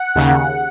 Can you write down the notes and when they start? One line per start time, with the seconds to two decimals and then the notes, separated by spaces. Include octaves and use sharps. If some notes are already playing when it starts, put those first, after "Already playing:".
Already playing: F#5
0.16 D#2 C#3